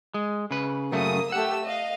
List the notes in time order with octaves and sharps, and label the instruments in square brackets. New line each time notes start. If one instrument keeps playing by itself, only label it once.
[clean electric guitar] G#3
C#3 B4
[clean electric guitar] F#2 C#3 A3 [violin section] A#3 D#6
[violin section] A3 G4 E6 [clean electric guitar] F#5
[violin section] D#5 F5